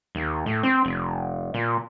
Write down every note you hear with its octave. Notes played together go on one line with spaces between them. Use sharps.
D#2
A2
C4
F1
A#2